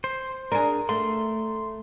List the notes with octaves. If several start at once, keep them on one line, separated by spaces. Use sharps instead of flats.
C5
D4 G#4 A#4
A3 C6